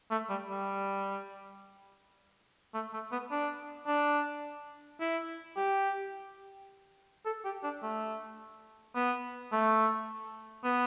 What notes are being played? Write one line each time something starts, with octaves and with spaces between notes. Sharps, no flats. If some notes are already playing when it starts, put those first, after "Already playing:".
A3
G3
G3
A3
A3
B3
D4
D4
E4
G4
A4
G4
D4
A3
B3
A3
B3